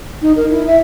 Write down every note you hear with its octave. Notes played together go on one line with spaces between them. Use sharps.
D#4
A#4
E4
E5